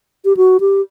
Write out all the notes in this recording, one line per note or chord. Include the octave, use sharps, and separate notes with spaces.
G4
F#4
G4